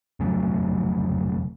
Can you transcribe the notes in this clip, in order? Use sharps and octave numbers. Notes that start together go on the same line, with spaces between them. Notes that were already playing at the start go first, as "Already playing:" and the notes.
F1 C#3 F#3 A3